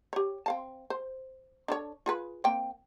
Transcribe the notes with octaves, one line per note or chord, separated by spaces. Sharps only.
G4 C#5
C4 F5 A5
C5
D4 A4 C#5
F4 G#4 B4
A#3 C4 G5